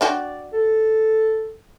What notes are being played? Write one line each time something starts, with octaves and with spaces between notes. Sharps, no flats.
D4 F#4 D5 G5
A4